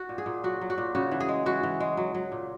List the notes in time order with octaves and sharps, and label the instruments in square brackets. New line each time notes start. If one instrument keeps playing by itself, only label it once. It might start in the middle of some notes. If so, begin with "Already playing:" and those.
Already playing: [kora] F#4
A#2
G#4
A#2
F#3 F#4
F#3
F#4
A#2
C#3 F#4
E3
G#4
G#3
E3 F#4
E3
G#3
F#3
F#3
A#2